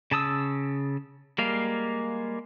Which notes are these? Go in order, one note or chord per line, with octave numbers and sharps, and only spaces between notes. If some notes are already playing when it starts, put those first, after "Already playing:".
C#3 A5 D#6 E6
G3 G#3 A#3 F5